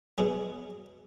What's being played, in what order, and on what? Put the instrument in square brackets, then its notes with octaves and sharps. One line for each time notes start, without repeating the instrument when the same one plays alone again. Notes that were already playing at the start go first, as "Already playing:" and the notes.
[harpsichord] B2 F#3 G#4